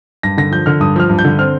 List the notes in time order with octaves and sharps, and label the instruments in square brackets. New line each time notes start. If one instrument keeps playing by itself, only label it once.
[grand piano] G2 A#6
D3 A#6
F3 G6
D3 F6
G2 D#6
F3 F6
G2
G6
D3
C4 F6